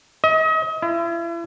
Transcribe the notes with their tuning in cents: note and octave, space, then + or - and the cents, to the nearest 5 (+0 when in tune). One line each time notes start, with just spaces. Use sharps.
D#5 +35
E4 +40